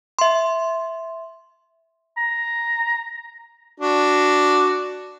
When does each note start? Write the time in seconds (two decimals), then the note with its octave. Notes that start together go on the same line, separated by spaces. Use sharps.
0.19 E5 C6
2.17 A#5
3.80 D4 F#4